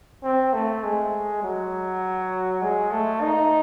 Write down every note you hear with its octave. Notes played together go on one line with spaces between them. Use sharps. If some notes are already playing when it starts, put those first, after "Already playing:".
C4
A3
G#3
F#3
G#3
A3
D#4